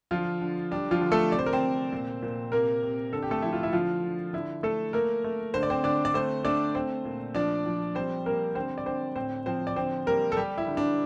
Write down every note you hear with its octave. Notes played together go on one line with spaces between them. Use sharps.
D3 F3 F4
D3
G3 D4
F3 F4
D3
A3 A4
C3 D5
C5
A#4
C4 C5
C3
A#2
A#2
C3 A#3 A#4
C3
D3 A4
G4
A3 A4
F3 E4
F4
E4
D3 F3 F4
D3
D3 E4
A3 A4
A3 A#3 A#4
A3
D3 C5
D5
C4 C5
D3 D4 D5
D5
A3 C4 C5
A3 D4 D5
A3 C4 C5
A#2
F3 D4 D5
F3
G3 C4 C5
G3 A#3 A#4
D3 C4 C5
D5
D3 C4 C5
A2 C4 C5
F3 C4 C5
D5
D3 C4 C5
G3 A#3 A#4
A4
G3 G4
E4
D3
D4